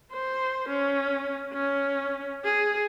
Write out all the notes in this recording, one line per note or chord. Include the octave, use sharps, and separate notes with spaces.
C5
C#4
C#4
G#4